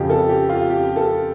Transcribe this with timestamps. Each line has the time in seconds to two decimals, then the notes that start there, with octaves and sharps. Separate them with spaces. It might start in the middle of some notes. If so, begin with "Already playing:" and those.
Already playing: F2 C#3 F3 G4
0.10 A4
0.29 G4
0.49 F4
0.70 G4
0.96 A4